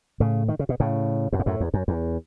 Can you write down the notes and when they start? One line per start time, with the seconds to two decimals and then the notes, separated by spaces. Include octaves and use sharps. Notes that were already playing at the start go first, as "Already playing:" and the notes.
0.20 A2 C#3
0.48 D#3
0.59 C#3
0.69 B2
0.80 A2 C#3
1.32 F#2 A2
1.39 G#2
1.46 F#2 A2
1.60 E2
1.74 F#2
1.88 E2